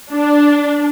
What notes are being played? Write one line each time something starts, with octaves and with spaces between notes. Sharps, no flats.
D4